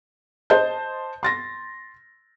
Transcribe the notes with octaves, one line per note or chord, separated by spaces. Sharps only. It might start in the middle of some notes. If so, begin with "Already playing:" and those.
C5 D#5 A5 G6
C6 A6 A#6